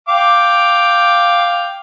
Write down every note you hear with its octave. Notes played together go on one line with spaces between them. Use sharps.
F5 G5 D6